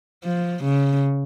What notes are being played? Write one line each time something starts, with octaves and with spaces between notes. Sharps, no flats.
F3
C#3